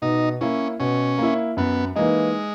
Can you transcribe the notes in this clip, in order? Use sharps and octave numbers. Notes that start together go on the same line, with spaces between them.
B2 D#4
A#3 C#4 E4
B2 C#4
A#3 E4
F#2 B3
E3 G#3 A#3 D#4